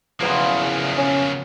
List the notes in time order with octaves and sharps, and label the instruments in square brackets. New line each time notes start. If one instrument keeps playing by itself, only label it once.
[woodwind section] E2 [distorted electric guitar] C#3 A#3 [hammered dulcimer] F3 F#3 B3
[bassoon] C#4